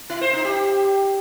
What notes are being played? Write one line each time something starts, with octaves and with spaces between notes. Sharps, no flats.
E4
C5
D#4
G4